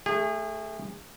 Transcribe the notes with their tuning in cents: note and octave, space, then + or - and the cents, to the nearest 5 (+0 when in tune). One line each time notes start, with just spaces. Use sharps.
A3 +0 G#4 -35